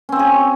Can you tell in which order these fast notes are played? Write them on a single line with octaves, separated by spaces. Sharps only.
C#4 C4 C#5 G#4